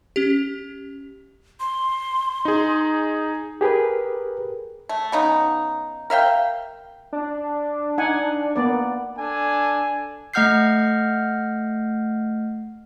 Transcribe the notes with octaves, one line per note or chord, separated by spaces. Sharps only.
C#4 G4
C6
D#4 G#4
G4 G#4 A#4 B4
A3
C#3 B3 D#4
A#4 E5 F5 G5
D4
D#4 F#5 G#5
A#3 B3 D5
D4 A4 G#5
A3 D#5 F#5 F6 G6 C7